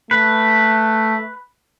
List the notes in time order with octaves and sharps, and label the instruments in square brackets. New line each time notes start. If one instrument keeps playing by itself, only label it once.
[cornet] A3 [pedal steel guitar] B4